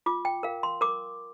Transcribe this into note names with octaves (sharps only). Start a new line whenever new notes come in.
F4 D6
G5
A#4 F5
C6
A#4 D6